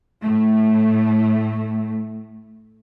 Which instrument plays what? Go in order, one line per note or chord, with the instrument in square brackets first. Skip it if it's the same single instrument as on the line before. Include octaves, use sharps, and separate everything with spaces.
[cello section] A2 A3